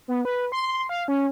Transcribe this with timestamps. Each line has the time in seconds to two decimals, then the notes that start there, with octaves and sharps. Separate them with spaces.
0.08 B3
0.25 B4
0.52 C6
0.89 F5
1.08 C#4